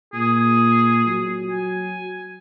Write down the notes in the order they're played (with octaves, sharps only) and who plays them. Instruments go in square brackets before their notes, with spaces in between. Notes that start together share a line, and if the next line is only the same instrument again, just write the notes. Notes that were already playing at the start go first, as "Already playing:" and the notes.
[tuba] A#2 [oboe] G#4
[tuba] F#3
[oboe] G#5